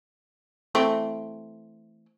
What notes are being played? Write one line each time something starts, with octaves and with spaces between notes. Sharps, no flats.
E3 A3 C4